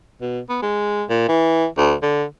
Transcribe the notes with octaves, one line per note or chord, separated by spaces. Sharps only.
B2
B3
G#3
A#2
E3
D2
D3